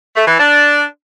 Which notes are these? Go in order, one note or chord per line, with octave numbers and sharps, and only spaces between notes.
A3
E3
D4